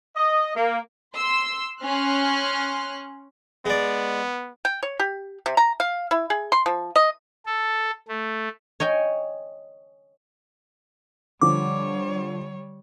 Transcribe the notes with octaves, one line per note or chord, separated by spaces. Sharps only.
D#5
A#3
C6 E6
C#4 C6 F6 F#6
G#3 B3 D5
G5
C#5
G4
C3
A#5
F5
E4
G#4
C6
F3
D#5
A4
A3
C#5 D#5 G5 G#5
D3 F3 G3 C#5 D6